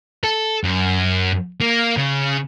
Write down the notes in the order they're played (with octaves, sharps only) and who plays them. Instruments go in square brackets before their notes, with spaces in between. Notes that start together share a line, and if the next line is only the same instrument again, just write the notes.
[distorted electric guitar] A4
F#2
A#3
C#3